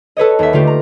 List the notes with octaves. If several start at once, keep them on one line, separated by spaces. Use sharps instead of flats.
A4 B4 C#5 D#5
D#2 E5
D3 A3 F4 G4
A#5